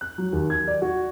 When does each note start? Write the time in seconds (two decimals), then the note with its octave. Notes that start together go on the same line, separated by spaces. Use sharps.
0.01 F#6
0.18 F#3
0.33 D#2
0.50 G#6
0.68 D5
0.82 F#4